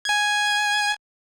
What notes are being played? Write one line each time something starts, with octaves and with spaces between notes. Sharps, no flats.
G#5 G#6